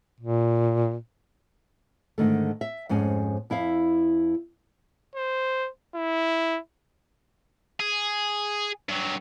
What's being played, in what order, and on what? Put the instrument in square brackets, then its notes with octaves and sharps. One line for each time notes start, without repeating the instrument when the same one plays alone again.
[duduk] A#2
[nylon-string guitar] G#2 D3 D#3 A3
E5
F2 G#2 C#4 G#5
F2 E4 E5 F5
[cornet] C5
E4
[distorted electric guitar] G#4
G2 F#3